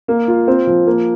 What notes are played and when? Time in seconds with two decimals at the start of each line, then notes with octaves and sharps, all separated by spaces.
0.08 A#3
0.28 F4
0.48 C4
0.67 F3
0.87 A#3